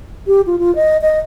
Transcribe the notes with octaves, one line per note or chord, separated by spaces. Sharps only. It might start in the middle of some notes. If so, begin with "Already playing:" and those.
G4
F4
F4
D#5
D#5